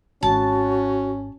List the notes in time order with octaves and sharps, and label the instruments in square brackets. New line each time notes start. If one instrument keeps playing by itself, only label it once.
[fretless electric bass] G#1 [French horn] C#4 [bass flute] F#4 [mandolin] A5